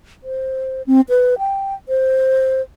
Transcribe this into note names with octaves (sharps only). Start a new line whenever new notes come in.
C5
C4
B4
G5
C5